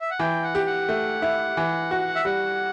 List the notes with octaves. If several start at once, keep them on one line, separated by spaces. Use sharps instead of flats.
E5
F#5
E3 G5
F#5
G4
F#5
A3
E4
E3
F#4
E5
G3 F#5